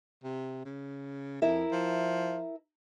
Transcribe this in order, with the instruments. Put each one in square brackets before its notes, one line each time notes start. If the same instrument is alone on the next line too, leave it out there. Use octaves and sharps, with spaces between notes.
[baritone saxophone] C3
C#3
[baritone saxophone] F2 [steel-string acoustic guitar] E4 A#4 E5
[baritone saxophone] F3